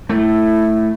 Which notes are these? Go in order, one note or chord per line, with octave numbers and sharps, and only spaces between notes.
A3 E4